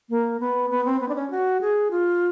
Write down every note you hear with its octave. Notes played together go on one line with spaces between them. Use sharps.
A#3
B3
B3
C4
B3
D4
C#4
F#4
G#4
F4